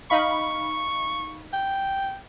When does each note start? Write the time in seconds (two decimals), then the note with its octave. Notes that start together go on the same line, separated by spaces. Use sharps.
0.10 D#4 F5 B5 C#6
1.53 G5